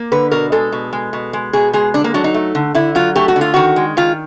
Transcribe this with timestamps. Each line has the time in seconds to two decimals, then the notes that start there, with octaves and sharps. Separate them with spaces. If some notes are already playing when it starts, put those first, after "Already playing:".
Already playing: A#3
0.12 D3 B4
0.32 B2 A#4
0.52 G#3 A4
0.72 B2
0.93 G#3
1.13 B2
1.33 G#3
1.53 B2 G#4
1.73 G#3 G#4
1.94 D3 D4
2.04 A#3
2.14 F#3 D4
2.24 D#4
2.34 A3
2.55 D3
2.75 D3 E4
2.95 F#3 F4
3.15 A3 G4
3.28 F#4
3.36 D3
3.41 F4
3.54 D#3 F#4
3.76 G#3
3.97 D#3 F4